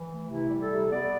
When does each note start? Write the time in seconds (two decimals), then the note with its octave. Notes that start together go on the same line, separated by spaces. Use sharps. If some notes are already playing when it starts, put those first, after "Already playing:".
Already playing: E3
0.08 A3
0.28 C3 E4
0.49 G3
0.60 A4
0.70 C3
0.90 B3 D5